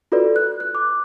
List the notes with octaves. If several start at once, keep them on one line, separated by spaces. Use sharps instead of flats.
F4 F#4 A4 B4 D5
F#6
F#6
D6